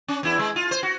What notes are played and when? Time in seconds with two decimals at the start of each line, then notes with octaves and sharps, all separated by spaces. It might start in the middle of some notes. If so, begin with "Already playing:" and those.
0.08 C#4
0.23 E2 E4
0.39 G#3
0.56 F4
0.71 C5
0.83 F#4